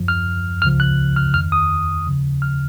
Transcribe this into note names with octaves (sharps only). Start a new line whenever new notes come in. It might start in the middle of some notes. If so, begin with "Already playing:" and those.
Already playing: F#2 F3
F6
C#2 C#3 F3 F6
F#6
F6
F2 D#3 F6
D#6
D#2 C#3 F3
F6